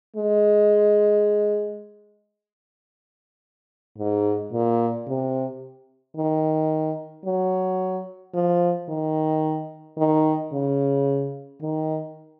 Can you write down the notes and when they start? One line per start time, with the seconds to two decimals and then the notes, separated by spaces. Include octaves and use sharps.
0.16 G#3
3.98 G#2
4.53 A#2
5.07 C3
6.17 D#3
7.25 F#3
8.34 F3
8.89 D#3
9.98 D#3
10.53 C#3
11.62 D#3